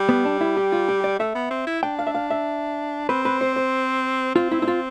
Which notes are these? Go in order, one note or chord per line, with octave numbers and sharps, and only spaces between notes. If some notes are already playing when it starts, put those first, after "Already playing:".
Already playing: G3
B3
D4
E4
G4
F4
G4
D5
A3 E5
B3
C4
E4
D4 G5
F5
E5
F5
E5
C4 B4
B4
C5
C5
C4 F4
E4
E4
F4